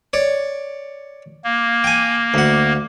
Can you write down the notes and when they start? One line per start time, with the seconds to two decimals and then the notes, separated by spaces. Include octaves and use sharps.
0.13 C#5 D5
1.44 A#3
1.84 G5 G#5
2.34 D2 F#5